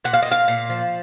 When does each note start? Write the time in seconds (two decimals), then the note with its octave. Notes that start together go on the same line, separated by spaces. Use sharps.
0.04 A#2 F#5
0.13 F5
0.22 A#2 D#5
0.31 F5
0.48 A#2
0.70 F3